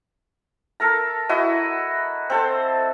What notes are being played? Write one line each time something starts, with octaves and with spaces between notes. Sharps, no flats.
A4 A#4 A#5
E4 F#4 D#5
C4 A4 C5